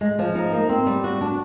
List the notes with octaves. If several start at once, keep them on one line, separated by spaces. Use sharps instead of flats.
G#3
F3
D#4
A#3
C4
G3
F#4
D4